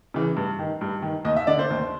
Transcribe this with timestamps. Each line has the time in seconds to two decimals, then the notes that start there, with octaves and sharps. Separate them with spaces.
0.14 C#3 E3
0.37 G2
0.59 D#3
0.81 G2
1.02 D#3
1.25 D#2 D#5
1.36 E5
1.47 D3 D5
1.59 C5
1.70 D#2